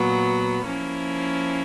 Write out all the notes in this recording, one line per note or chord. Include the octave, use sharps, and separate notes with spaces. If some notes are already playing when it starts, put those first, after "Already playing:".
Already playing: A#2 F#3 B3
F3 A#3 C#4 E4